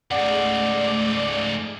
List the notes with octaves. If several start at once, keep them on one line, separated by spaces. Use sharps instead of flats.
G#2 C#3 A3 G#4 D5 F#5